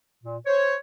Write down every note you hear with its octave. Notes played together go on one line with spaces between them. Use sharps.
A#2
C5 C#5